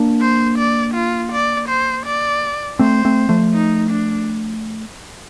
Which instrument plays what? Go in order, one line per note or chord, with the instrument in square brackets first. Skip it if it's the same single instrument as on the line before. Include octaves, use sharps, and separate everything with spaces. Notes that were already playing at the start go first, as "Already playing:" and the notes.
Already playing: [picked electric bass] A#3 D4
[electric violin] C5
D5
F4
D5
C5
D5
[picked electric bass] A3 C4 [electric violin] C5
[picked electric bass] A3 C4
F3 A3
[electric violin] D#4
D4